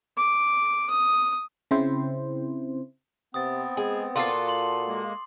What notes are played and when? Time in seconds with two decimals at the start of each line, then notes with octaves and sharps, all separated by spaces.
0.17 D6
0.90 D#6
1.71 C#3 C4 E4 C5
3.34 C3 B3 C4 D#6 A6
3.77 G#3 G#4
4.16 A#2 F4 F#4 A4 C6 D6 C7
4.48 C6 F#7
4.88 G#3 A#3